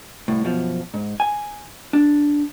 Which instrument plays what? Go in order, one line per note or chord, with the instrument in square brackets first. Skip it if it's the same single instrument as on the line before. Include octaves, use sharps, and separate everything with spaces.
[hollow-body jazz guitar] C2 A2
F#2 B2 F3
G#2
G#5
D4